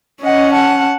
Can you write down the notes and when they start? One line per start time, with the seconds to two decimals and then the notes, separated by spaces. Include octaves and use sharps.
0.23 C#4 D#5 F#5
0.52 F#5 A5